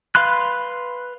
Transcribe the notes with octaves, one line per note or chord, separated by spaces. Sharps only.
B4 F5 B5 C6 F#6